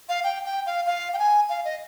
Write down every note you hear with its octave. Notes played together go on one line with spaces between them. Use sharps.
F5
G5
G5
F5
F5
G5
G#5
F5
D#5